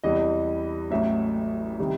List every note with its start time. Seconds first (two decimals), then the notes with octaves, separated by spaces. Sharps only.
0.04 E2 C3 E3 G3 D#5
0.91 A1 A2 F#3 E5
1.79 C3 D#3 G3